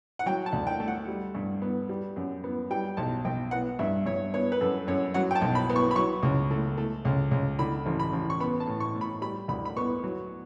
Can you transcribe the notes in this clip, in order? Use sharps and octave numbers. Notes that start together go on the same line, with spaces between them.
F#5
F#3 G5
A5
D2
G5
A3
F#5
G3
G2
B3
G3
F#2
B3
G3 G5
B1 A5
B1 G5
B3 F#5
G2 E5
G2 C#5
B3 C#5
B4
F#2 A4
F#2 C#5
F#3 F#5
G5
A5
B1
B5
B3
C#6
B5
F#3 C#6
C#2
A3
A3
C#2
C#2
D3 B5
A1
B5
A1
C#6
B3 B5
A5
A2
C#6
A2
B5
G3 B5
D2 B5
B5
B3 C#6
F#3